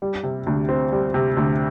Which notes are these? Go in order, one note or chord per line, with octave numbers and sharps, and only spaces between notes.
G3
C3
D2
C4
G3
C3
D2